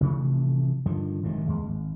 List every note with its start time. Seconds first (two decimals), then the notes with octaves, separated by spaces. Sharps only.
0.01 A1 C3 F3 A3
0.86 G2 D3 D#3 F3
1.23 G#1 F#2 C3 D#3
1.48 D#2 G#3
1.65 G#1